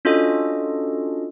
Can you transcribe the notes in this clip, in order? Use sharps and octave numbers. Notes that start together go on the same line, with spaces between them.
C#4 D4 F4 F#4 A4 D#5